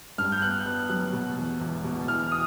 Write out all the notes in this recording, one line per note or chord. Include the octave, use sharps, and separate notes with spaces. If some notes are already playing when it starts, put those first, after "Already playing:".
G2 F6
G6
B3 F#6
B3 F#6
F#3 F#6
B2
E2
E1
B2
E3 F6
D#6